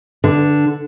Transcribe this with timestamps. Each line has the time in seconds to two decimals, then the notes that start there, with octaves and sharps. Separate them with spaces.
0.24 D3